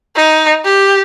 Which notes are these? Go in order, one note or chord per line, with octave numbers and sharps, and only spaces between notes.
D#4
G4